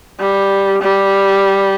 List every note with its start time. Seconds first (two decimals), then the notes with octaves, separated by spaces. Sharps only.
0.20 G3
0.82 G3